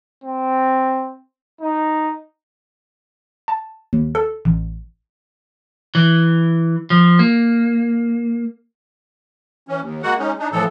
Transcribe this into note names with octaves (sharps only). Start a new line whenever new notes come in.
C4
D#4
A5
D#2
A4
A1
E3
F3
A#3
E3 C#4
D#2
G#3 A#3 F#4 F#5
G#3 C#4 D#4
D4 D#4
A2 E3 F3 A4